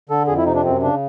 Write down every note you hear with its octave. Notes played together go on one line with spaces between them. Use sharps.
D3 A4
F2 G#4
E4
C3 D#4
D4
F#2 C4
C#3 D4